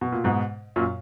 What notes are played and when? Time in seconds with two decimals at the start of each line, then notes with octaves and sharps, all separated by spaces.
0.01 B2
0.12 A#2
0.24 G#2 B2
0.76 F#2 A#2